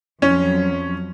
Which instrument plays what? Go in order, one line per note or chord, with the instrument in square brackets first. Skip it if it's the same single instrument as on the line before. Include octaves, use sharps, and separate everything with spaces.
[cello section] F2 F#3 [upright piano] C#4